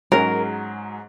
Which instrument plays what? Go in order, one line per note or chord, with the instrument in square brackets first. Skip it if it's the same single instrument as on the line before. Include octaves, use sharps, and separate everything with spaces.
[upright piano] G#2 F#3 C#4 G#4 [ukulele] A#4